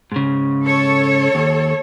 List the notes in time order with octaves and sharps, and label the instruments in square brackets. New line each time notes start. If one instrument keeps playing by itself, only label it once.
[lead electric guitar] G#2 C#3
[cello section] A4 C#5
[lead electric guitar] D#2